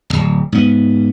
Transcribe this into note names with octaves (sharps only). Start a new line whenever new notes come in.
D1 G1
G#2 B3